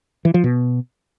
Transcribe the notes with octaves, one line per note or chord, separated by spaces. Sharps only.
E3
F3
B2